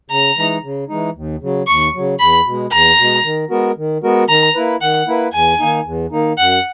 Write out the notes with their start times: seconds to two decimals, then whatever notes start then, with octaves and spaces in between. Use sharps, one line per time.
0.10 C#3 A#5
0.37 E3 G#3 D#4
0.64 C#3
0.89 E3 G#3 D#4
1.15 D#2
1.42 C#3 F#3
1.67 D#2 C#6
1.94 C#3 F#3
2.20 E2 B5
2.46 B2 G#3
2.71 E2 A#5
2.98 B2 G#3
3.24 D#3
3.50 G#3 B3 F#4 A#4
3.77 D#3
4.03 G#3 B3 F#4 A#4
4.28 D#3 A#5
4.55 A#3 E4 B4
4.81 D#3 F#5
5.07 A#3 E4 B4
5.33 E2 G#5
5.59 D#3 A#3 D#4
5.85 E2
6.11 D#3 A#3 D#4
6.38 F#2 F#5